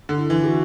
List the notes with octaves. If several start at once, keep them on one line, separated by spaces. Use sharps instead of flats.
D3
E4
E3
G#4
F#4